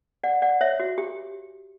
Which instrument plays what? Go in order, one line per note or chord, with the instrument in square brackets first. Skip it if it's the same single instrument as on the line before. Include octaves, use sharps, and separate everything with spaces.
[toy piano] D5 F#5
D5 F#5
C#5 E5
F#4
G4